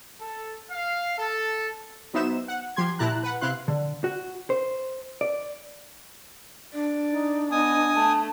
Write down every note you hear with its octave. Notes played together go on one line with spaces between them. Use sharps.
A4
F5
A4
F#3 B3 D#4 C5 E5 E7
F#5
F3 G4 C6 G#6
A#2 E4 G4 A5 A#5 F#6
B4 F#5
C3 E4 F5 C6 F#6
D3
F#4
C5
D5
D4 D5
D#4
B3 D#5 G#5 D#6
A3 A5